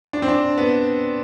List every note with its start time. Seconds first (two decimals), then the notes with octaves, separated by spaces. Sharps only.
0.13 D4
0.22 C4
0.28 D4
0.58 B3